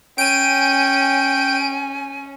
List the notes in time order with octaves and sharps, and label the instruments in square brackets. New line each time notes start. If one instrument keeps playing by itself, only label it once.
[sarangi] C#4 [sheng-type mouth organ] G5 [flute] G#5 [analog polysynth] D7 D#7